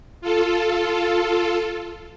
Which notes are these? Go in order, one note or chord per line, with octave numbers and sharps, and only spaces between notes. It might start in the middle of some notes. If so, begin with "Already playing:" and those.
F4 A4